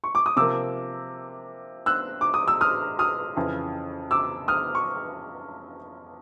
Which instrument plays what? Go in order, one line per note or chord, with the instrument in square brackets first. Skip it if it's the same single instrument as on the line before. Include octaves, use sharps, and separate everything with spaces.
[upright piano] C#6
D6
D#6
C3 F3 A#3 D6 E6
E6 F#6
D6
D#6
E6
D#6 F6
D#6 F6
F2 C#3 E3
D6 E6
D#6 F6
C#6